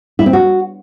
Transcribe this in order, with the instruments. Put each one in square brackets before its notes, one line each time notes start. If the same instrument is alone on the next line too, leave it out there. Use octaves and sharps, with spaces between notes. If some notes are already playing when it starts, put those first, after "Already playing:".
[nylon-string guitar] E4
C4
F#4